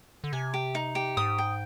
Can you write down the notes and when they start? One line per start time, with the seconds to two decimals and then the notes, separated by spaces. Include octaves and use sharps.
0.24 D3
0.33 C3 G#5
0.54 G4
0.75 D#4
0.95 G4
1.17 G#2 D#6
1.38 G5